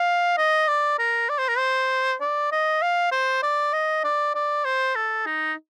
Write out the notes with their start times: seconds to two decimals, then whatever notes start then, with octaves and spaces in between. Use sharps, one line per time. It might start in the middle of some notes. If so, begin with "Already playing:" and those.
Already playing: F5
0.37 D#5
0.68 D5
0.99 A#4
1.29 D5
1.39 C5
1.48 A#4
1.58 C5
2.21 D5
2.52 D#5
2.82 F5
3.12 C5
3.43 D5
3.73 D#5
4.04 D5
4.35 D5
4.65 C5
4.95 A4
5.26 D#4